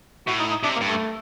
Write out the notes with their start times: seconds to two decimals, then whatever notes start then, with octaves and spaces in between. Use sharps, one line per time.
0.27 A2 F#4
0.39 D#4
0.51 D#4
0.63 C3 D4
0.75 A#3
0.81 G2
0.87 A3